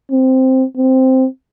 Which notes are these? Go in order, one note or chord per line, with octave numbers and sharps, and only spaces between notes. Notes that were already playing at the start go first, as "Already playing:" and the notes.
C4
C4